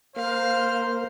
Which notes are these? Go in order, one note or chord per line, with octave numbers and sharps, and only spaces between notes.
A#3 A#4 C5 F5